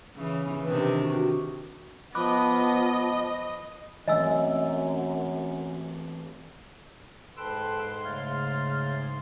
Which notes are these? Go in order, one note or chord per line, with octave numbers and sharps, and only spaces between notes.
C#3 E3
C3 D#3 D4 B4
F#4
F3 B3 D#5 B5 D6 F#6
F#2 E3 A3 C4 D#5 G#5 E6
G#2 A4 B4 G5 A5 C6
C#3 A3 C#5 F5 A6